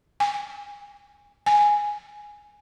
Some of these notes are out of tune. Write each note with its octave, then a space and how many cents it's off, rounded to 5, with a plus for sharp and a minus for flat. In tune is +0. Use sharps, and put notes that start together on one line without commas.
G#5 -20
G#5 +0